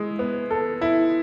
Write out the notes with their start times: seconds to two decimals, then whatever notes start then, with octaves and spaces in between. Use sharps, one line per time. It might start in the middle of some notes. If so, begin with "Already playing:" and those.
Already playing: G#3 E4
0.19 B3
0.51 A4
0.81 E4